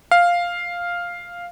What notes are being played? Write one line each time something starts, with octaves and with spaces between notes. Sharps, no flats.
F5